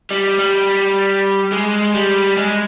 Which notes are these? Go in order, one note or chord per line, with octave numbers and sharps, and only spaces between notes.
G3
G3
G#3
G3
G#3